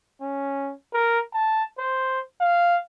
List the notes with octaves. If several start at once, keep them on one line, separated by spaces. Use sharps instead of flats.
C#4
A#4
A5
C5
F5